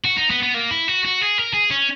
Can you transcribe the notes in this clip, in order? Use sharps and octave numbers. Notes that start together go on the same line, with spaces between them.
F#4
D#4
B3
B3
A#3
E4
F#4
F#4
G#4
A#4
G#4
C#4